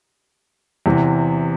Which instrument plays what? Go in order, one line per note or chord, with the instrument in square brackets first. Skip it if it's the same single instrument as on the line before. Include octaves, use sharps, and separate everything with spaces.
[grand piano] E2 C3 E3